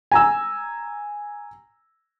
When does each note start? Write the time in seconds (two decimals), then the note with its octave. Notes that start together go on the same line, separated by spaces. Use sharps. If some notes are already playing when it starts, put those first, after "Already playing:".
0.12 G#5 A#5 E6